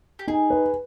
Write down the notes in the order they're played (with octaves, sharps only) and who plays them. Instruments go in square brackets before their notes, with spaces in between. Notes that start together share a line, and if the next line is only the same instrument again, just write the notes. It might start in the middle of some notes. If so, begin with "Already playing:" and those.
[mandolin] G4
[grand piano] D#4 [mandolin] G#4
[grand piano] B4